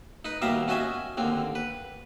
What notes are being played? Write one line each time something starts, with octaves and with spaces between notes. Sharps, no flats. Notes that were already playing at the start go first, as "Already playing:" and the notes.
D#4 B4
D#2 B2 G3 E5 F5 A#5
C#4 F#4 D#5 E5 G#5
D#2 D3 C4
B4